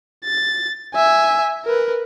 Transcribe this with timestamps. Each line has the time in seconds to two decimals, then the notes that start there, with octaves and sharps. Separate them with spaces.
0.25 A6
0.94 E5 G#5
1.65 A#4 B4